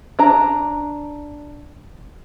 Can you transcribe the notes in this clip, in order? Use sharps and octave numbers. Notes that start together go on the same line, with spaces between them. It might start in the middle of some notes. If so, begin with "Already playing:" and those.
D4 A#5